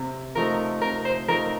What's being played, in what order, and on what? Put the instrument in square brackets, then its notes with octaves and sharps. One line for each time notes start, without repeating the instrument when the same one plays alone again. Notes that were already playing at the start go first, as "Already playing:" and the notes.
Already playing: [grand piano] C3
[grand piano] F3 A3 D#4 [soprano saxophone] A#4
[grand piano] C3 [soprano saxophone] A#4
[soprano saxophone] C5
[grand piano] F3 A3 D#4 [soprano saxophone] A#4